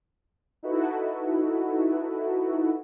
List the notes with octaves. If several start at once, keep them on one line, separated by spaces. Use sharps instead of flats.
D#4 E4 F#4 A4 B4